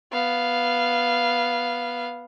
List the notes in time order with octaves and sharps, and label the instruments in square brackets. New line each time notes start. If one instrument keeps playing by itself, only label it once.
[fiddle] B3 F5